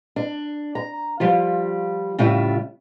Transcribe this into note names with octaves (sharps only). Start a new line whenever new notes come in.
D4
A#5
F3 G3 F4
A2 C#3 G3 F4 E5